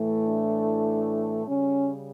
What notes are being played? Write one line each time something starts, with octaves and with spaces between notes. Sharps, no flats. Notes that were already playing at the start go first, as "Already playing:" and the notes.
Already playing: A2 E3 A3
D4
C#3 G3 C#4